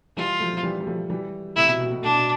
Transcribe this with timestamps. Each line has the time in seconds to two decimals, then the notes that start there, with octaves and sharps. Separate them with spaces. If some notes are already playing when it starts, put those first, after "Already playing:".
0.17 E3 G3 F4
0.40 F3 A3
0.53 F3
0.63 E3 G3
0.80 G3
0.87 F3 A3
1.10 E3 G3
1.56 A2 C3 E4
1.68 B2
1.80 B2
1.91 B2
2.03 A2 D4
2.14 B2